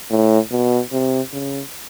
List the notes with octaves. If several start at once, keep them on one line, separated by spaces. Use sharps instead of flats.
A2
B2
C3
C#3